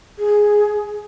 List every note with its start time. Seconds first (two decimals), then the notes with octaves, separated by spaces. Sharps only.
0.19 G#4